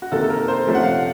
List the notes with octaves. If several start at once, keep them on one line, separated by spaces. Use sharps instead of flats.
F#4
C3 D#3 A#3 A4
A4
A#4
C5
C3 F3 A3 C#4
F#5
F5
F#5